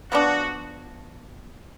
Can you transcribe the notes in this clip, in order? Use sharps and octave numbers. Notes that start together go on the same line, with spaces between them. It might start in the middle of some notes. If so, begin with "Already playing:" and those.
F3 B3 D4 F#4